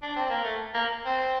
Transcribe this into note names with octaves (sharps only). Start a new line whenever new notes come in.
D4
C4
A#3
A3
A#3
C4